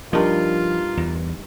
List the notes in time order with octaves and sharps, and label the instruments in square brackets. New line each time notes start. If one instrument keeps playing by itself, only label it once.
[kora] G2 D#4 [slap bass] F3 [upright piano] D4 A#4 [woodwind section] F4
[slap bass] E2